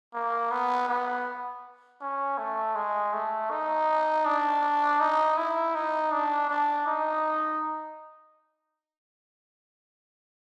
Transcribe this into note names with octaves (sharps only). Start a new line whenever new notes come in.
A#3
B3
B3
C#4
A3
G#3
A3
D#4
D4
D#4
E4
D#4
D4
D4
D#4